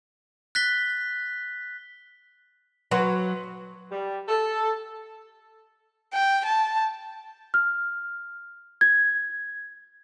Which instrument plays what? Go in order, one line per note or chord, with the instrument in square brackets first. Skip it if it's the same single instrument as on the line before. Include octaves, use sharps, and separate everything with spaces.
[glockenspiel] F#6 A6 B6 G7
[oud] F#3 [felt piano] B4 F#5 C6
[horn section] G3
A4
[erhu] G5
A5
[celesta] F6
G#6